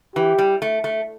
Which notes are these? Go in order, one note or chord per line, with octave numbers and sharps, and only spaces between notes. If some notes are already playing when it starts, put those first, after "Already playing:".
E3 G4
G3
A3
A3